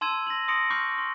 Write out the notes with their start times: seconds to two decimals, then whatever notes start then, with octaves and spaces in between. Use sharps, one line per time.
0.01 A5 C6 E6 G#6 D#7 E7
0.27 A#6 F#7
0.48 C6 D#6 A#6 C#7 D7 F7
0.70 B5 C#6 D6 F6 G6 C7
0.98 C6